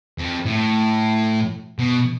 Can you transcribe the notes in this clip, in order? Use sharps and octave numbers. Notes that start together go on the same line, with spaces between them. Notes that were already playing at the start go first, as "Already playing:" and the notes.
F2
A2
B2